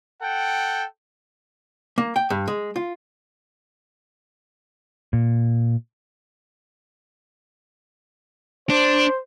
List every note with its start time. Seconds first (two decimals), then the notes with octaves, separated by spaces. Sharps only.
0.22 A4 F#5 G5
1.98 A#3
2.16 G5
2.30 G2
2.48 G#3
2.76 F4
5.13 A#2
8.69 D4 C5